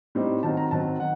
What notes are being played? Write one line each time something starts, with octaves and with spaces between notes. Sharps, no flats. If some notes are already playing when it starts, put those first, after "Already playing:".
A2 G3 C4 D#4
D#3 F#3 C4 A5
A#5
D#3 F#3 C4 A5
D#3 F#5